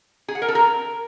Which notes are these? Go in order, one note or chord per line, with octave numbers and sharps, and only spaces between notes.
G#4
F#5
A#4
A4
A#4